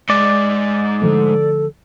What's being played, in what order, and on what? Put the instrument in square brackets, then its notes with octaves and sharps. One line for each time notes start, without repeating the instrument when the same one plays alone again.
[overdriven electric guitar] G#2 [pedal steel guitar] D5
[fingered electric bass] D3 F3 A3 [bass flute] A4